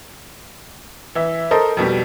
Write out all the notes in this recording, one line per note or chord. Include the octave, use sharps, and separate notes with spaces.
E3 E5
A4 A#4 C5 D#5
F2 B2 G3